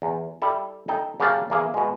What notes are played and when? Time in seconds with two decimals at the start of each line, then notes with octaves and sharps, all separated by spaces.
0.02 E2
0.42 G3 E4 A4
0.88 D#4 A4 G5
1.20 C#3 F#3 A#3 G4 F5 A5
1.50 E2 A#3 G#4 E5
1.74 B2 G#3